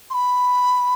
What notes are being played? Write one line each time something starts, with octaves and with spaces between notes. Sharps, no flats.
C6
B5